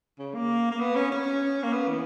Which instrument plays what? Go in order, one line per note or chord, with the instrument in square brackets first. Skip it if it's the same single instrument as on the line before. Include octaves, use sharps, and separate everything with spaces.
[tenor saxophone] C#3
A#3
A#3
B3
C#4
C#4
A#3
B3
E3